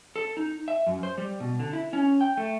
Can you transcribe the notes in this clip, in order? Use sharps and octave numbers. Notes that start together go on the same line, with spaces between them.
A4
D#4
E5
F#2
C5
G3
B2
D3
E4
C#4
G5
A3